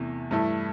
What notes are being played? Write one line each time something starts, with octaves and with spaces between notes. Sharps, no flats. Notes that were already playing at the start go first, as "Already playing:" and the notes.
Already playing: E2 C3 E3 A3
G2 E3 A3 E4